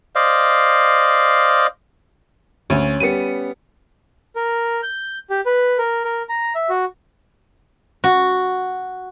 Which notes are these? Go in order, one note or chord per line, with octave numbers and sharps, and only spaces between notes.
C5 D5 D#5 F5
D2 C#4
G3 B3 C#7 D#7
A#4
G6
G4
B4
A#4
A#4
A#5
E5
F#4
F#4